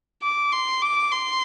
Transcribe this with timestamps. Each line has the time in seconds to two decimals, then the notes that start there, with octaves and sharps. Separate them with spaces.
0.23 D6
0.52 C6
0.82 D6
1.12 C6